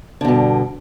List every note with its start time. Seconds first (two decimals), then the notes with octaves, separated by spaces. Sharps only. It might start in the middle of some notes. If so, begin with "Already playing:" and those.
0.21 D3
0.25 B2
0.28 G2